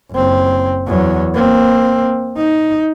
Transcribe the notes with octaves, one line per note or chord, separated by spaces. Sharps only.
F#1 C4
E2 F#3
A#3 C4
D#4